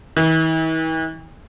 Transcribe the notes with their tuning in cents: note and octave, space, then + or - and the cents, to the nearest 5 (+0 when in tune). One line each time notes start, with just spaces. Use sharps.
E3 -45